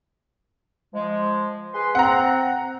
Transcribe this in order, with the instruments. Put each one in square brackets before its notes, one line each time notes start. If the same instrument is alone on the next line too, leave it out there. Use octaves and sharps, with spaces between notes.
[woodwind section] F3 G#3
G#4 B4 C6
[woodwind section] C4 [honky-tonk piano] F#5 A#5